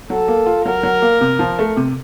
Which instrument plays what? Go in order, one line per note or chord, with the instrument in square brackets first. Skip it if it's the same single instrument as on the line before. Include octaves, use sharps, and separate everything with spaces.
[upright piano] F#3 [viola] A4
[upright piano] A#3
F4
[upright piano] F#3 [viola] A#4
[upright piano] F#3
A#3
C3
F3
A3
C3